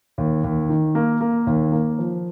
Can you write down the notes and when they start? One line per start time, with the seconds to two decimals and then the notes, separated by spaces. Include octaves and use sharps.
0.18 D#2
0.44 D#2
0.69 D#3
0.95 A#3
1.21 A#3
1.47 D#2
1.72 A#3
1.99 F3